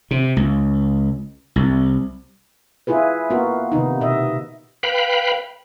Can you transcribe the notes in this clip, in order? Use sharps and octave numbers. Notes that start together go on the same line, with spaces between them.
C3
C#2
C2
E4 F4 G#4 B4
A#3 B3 F4 F#4 A#4
C3 D#3 B3 D#4
B2 D#5 E5
B4 F5 G5 B5